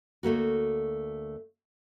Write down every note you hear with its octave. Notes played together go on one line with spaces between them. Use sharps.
D2 A3 A#3 F#4